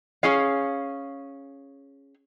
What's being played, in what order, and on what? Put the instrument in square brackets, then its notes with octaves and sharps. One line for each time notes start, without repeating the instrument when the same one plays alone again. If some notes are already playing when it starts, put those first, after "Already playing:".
[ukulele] C#4 G#4 F5